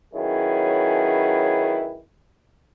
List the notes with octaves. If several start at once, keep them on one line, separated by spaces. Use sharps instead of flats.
D#3 F#3 C#4 E4 G#4 B4